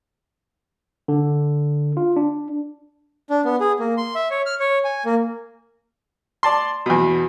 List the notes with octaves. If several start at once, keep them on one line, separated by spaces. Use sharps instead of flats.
D3
F4
D4
D4
B3
G#4
A#3
C6
E5
C#5
F6
C#5
G#5
A#3
D5 A5 C6
E2 B2